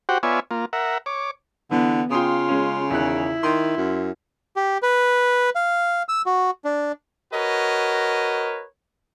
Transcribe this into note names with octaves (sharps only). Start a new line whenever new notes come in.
F#4 G4 C5 F#5 G5
B3 F4 C#5 D5 E5 G#5
A#3 F4
A#4 E5 F#5
C#5 D6
D3 E3 B3
C#3 F4 G5 C6 D#6
G#3 C#4
E2 D#3 E4 F#6
D#3 C6
F#2
G4
B4
F5
E6
F#4
D4
F#4 A#4 B4 C#5 D#5